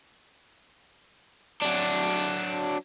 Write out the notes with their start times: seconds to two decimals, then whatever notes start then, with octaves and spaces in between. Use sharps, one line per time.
1.62 F#3 D4